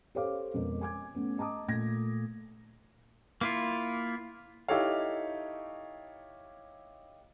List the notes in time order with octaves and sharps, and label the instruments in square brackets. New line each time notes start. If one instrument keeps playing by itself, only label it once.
[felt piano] G4 A4 C5 C#5 F5 D6
F2 B2 G#3 A#4
G#5 D6 G#6
A3 B3 C#4
D#5 A5 A#5 D6 D#6
A#2 A3 G#6 A#6
[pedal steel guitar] A#3 E4 F4
[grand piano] D#4 E4 G4 A4 C#5 F5